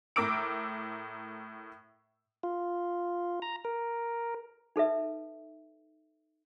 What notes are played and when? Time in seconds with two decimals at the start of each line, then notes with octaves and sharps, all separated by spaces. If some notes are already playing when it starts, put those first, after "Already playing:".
0.16 A2 A#4 D6 E6 D7
2.43 F4
3.42 A#5
3.65 A#4
4.76 D#4 A4 B4 E5